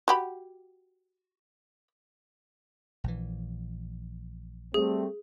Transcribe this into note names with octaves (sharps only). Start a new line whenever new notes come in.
F#4 G4 B5
A#1 E3
G3 A3 C4 G#4